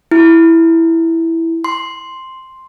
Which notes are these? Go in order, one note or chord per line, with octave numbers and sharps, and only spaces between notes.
E4
C6